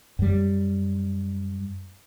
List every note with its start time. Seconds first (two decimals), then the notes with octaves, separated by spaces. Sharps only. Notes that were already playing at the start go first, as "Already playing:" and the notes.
0.19 F#2 G3